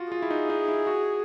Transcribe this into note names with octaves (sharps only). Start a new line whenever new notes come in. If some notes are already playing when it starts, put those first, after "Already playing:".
Already playing: F4 F#4
F4 G#4
E4
D#4
D#4
E4
F#4